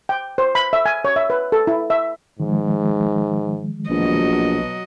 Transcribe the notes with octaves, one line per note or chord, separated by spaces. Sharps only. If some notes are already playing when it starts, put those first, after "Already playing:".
G5
C5
B5
E5
G#5
C#5
E5
B4
A4
E4
E5
G#2 D#3 F3 G#3
A#1 B2 F#3 D#5